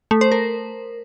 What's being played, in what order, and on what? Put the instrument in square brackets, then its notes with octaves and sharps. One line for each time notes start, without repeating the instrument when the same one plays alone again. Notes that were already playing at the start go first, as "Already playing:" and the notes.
[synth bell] A3
C5
A#4